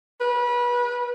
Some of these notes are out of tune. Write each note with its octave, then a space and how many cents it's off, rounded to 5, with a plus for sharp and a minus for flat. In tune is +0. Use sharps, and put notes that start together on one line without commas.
B4 -25